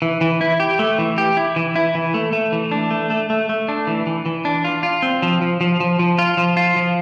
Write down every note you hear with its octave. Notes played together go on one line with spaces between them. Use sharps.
E3
E3
E4
G4
A3
E3
G4
E4
E3
E4
E3
A3
A3
E3
D4
A3
A3
A3
A3
D4
E3
E3
E3
D4
F4
F4
C4
F3
F3
F3
F3
F3
F4
F3
F4
F3